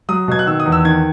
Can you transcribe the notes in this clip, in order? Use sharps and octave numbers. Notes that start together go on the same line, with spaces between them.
F#3 D#6
B2 G#6
F#6
D#3 E6
D#6
E2
E6
D#3 G#6